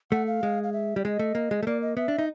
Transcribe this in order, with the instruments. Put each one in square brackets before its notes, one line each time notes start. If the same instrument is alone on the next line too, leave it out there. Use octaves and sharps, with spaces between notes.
[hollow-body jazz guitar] A3 [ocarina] F#5
[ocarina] F5
[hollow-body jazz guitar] G#3
[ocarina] F5
E5
[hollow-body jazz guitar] G3 [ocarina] D5
[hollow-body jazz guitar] G#3 [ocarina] D#5
[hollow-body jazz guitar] A3
A#3
G#3
A3
[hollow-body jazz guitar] A#3 [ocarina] D5
[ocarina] D#5
[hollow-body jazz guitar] B3 [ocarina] E5
[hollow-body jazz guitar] D4
D#4